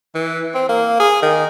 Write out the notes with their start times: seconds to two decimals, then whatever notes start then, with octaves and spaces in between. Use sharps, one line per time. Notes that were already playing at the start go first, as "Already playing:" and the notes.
0.15 E3
0.55 C4
0.70 A#3
1.00 G#4
1.23 D#3